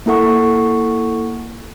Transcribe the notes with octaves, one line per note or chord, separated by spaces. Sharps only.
A#3 E4 A4 F#5 C#6